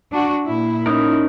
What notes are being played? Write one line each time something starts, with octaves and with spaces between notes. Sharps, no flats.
D4 F#4
A#2 E4
C#4 D#4 A#4